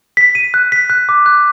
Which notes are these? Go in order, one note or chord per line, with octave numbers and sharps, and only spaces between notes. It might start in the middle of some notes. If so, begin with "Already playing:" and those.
B6
D#7
F#6
B6
F#6
D6
F#6